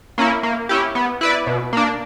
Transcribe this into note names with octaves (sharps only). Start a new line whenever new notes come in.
A#3 C#4 E4
A#3
C#4 E4 G4
B3
E4 B4 D5
B2
A#3 D4